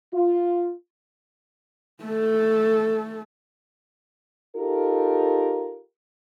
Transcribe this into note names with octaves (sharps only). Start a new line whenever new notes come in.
F4
A3 A4
D#4 F4 G4 A4 A#4